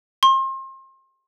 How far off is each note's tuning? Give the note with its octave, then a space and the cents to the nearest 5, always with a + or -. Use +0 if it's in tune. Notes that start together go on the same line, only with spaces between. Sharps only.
C6 +35